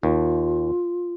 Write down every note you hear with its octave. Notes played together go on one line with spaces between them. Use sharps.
D#2 F4